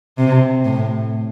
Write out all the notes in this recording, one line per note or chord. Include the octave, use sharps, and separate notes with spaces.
C3
A2